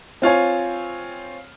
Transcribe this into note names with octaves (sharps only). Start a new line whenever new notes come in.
C4 F4 C#5 G#5